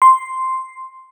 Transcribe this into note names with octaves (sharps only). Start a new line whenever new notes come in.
C6